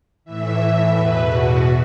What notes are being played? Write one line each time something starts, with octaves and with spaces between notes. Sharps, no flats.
A2 E3 E5
E2 B2 B4
F#4